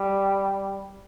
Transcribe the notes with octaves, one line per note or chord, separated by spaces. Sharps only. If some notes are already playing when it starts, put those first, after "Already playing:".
Already playing: G3